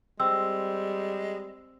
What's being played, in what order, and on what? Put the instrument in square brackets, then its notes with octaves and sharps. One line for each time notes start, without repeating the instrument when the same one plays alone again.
[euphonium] G3 [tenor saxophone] G#3 [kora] C4 [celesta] E6